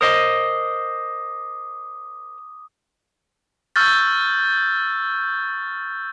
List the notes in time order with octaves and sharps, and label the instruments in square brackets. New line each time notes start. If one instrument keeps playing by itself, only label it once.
[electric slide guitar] A#4 C5 D#5 [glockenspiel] D6 D#6
[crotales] C#6 E6 F6 G6 A6